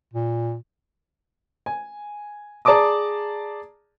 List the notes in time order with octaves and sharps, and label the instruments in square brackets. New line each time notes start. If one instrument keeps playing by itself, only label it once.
[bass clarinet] A#2
[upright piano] G#5
G#4 D5 A5 A#5 D6 D#6